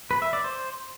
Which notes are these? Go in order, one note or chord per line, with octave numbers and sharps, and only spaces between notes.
B4
E5
D5
C5